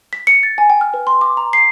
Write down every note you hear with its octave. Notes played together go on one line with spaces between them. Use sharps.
B6
C#7
A6
G#5
G5
F6
B4
C6
D6
A#5
C7